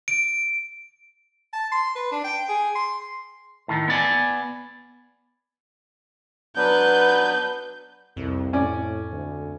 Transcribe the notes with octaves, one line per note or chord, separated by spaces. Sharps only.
D7
A5
C6
B4
D4
G5
G#4
C6
A2 D#3
B3 D5 G#5
F#3 B3 D4 B4 G6
C2 F2
A2 C#4 D5
D2